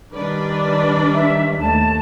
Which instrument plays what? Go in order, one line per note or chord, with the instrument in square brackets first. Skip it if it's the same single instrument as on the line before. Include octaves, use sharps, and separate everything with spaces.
[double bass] D#3 G3 [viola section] D4 B4 D5
[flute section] E5
[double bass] D#2 A3 [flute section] A5